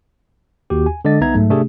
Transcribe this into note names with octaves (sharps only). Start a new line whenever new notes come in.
D#2 F#4 G4
G#5
D3 G#3 D4 D#5 A6
C2 B3 D#4 E5 A#5 G#6
G#2 F#3 A3
C3 A3 D4 G4 G#4